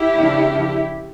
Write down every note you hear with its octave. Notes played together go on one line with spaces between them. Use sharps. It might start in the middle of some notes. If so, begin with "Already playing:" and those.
Already playing: E4 G4
C#3 F3 A#3 D4